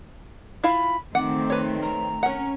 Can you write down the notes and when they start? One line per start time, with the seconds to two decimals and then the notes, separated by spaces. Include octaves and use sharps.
0.64 E4 F4 F5 B5
1.15 D#3 A3 C4 F#5 D6
1.50 B4 C#5
1.82 A#5
2.23 C#4 A#4 F#5